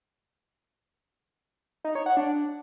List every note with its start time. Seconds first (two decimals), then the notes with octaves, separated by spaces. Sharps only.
1.84 D#4
1.95 C#5
2.06 F#5
2.17 D4